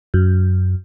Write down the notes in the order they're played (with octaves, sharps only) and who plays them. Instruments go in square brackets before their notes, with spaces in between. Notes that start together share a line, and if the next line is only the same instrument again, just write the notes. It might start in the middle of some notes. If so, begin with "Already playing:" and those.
[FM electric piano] F#2